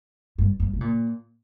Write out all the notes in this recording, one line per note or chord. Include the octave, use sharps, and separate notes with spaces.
G2
G2
C3
A#2